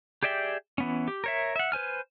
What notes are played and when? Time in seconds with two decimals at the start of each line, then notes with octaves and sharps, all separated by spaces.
0.23 G4 G#4 D5 E5 G5
0.78 E3 B3 C#4
1.08 G4
1.24 A#4 C#5 E5
1.56 E5 F#5
1.72 B4 C5 G#5 F6